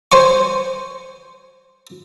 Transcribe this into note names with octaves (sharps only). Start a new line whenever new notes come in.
C5 G#5 C#6